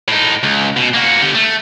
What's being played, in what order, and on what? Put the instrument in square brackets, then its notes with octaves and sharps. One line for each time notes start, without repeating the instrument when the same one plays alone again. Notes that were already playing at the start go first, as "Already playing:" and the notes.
[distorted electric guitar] A2 D#4
C#2
B2
A#3 F#4
D3 G4
A3